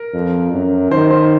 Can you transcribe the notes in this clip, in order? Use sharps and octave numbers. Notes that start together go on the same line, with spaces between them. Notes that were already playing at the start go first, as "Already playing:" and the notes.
Already playing: A#4
F2
F#2
D#3 C5
C5